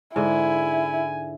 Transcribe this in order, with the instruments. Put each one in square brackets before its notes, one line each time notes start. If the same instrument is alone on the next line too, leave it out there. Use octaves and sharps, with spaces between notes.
[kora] G#2 D3 [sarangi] E4 [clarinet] G#5